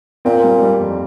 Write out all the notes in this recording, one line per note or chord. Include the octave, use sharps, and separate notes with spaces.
A#2 C4
G3
G3
F2